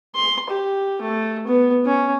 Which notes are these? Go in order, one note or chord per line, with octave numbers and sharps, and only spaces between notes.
C6
G4
A3
B3
C#4